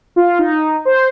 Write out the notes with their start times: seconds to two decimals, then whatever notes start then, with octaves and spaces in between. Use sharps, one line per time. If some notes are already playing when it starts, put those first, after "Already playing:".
0.16 F4
0.39 D#4
0.85 C5